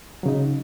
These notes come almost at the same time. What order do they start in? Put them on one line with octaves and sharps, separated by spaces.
F#3 C#3 D#4